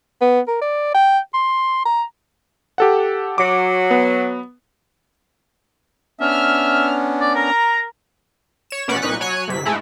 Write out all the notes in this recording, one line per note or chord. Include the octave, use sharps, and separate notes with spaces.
B3
A#4
D5
G5
C6
A#5
G4 A4 F#5
F#3 D6
B3
B3 C#4 D4 E5 F6
D5
A#4 A#5
C#5 E7
A#1 B2 C#4 D5 F#5 B6
C2 A#2 D#4 B4 C#6 F#6
F#3 C#5 G#5 F#6
G1 C3 B6
G#2 G#3 A3 E4